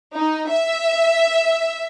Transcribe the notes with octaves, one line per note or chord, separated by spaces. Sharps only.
D#4
E5